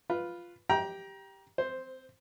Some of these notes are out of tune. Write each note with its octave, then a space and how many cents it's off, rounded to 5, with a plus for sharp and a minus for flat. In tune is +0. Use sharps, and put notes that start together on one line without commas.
F4 +0 B4 +0
G4 +0 G5 -5 A#5 +25
C4 -20 C5 +0